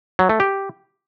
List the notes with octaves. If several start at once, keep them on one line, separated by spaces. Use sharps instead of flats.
F#3
A3
G4